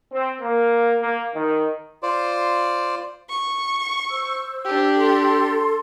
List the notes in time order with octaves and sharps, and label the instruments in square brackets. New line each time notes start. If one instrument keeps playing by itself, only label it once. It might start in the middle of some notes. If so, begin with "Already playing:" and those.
[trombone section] C4
A#3
A#3
D#3
[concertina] F4 C5 D5
[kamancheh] C#6
[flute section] C5 E6
[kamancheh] D4 G4
[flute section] A4 C6